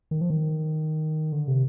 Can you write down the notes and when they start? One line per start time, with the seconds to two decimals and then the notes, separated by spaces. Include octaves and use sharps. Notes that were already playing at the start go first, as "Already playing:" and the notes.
0.11 D#3
0.21 F3
0.30 D#3
1.32 D3
1.48 C3